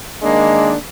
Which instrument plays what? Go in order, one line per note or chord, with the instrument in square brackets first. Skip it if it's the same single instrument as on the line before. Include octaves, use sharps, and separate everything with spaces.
[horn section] D#3 A#3 D4 [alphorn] G#3